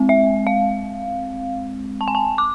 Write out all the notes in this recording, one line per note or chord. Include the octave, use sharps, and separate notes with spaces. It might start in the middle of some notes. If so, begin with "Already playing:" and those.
Already playing: G#3 C4
E5
F5
A5
G#5
A5
D6